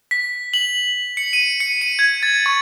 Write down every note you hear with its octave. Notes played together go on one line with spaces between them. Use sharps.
B6
F#7
C#7
D#7
C#7
D#7
G#6
A6
C#6